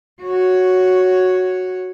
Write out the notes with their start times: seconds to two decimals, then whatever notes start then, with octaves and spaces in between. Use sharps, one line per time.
0.22 F#4 C#5